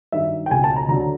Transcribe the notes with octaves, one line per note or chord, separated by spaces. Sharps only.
G2 D#3 F#3 E5
G5
C#2 B2 F#3 G#5
A5
A#5
D2 D3 F#3 A#5